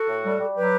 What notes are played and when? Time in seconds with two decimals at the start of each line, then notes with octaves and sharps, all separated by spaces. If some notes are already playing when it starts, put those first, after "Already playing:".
Already playing: F#4 A4
0.08 A2
0.24 G3
0.40 G3
0.56 F#3 G4 B4